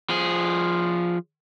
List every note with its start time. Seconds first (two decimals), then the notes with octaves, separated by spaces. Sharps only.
0.10 F3 G#4